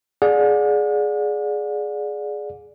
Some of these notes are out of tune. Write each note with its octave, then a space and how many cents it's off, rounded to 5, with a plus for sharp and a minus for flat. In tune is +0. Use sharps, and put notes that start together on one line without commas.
G#4 +10 D5 +0 F#5 -45